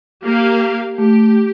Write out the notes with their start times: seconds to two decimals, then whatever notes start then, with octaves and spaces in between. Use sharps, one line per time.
0.24 A#3 G4 F5
0.98 A3 G4